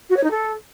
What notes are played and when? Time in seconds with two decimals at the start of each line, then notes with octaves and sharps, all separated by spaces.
0.09 F#4
0.16 C#5
0.23 D#4
0.30 A4